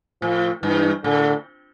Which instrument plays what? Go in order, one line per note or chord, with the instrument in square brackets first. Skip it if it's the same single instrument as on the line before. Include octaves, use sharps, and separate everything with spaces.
[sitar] A2 [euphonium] F3
[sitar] G2 [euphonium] E3
[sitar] A2 [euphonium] D3